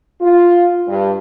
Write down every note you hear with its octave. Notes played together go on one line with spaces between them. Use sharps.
F4
G2